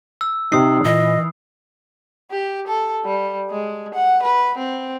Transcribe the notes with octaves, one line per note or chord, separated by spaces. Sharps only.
E6
C3 D#4 D#6 C7
A#2 E3 D#5
G4
A4
G3
G#3
F#5
B4
C4